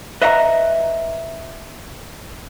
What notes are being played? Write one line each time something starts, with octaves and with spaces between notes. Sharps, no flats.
B4 D#5 E5 F#5 G#5 A#5